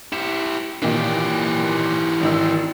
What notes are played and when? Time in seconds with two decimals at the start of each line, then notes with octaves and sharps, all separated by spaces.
0.12 E4 G4 E7
0.82 A#2 D#3 E3 G4
2.21 G#1 D#3 E6